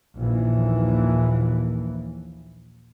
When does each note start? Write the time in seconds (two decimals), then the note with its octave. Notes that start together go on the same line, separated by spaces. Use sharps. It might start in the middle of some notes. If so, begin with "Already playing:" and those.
0.16 A#1 D#2 E3